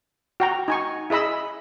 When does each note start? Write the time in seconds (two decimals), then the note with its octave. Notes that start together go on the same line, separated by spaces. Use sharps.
0.40 F#4 G5 A#5
0.68 D#4 G#5 C#6
1.10 E4 G#4 D#5 B5 E6